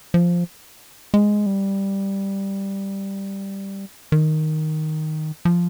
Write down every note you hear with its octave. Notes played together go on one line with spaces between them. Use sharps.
F3
G#3
G3
D#3
F3